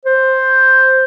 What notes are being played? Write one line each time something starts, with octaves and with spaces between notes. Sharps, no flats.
C5